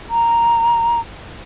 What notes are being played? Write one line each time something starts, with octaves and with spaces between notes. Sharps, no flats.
A#5